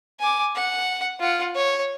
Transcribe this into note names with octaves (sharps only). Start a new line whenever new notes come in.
G#5 D6
F#5
F4 F#5
C#5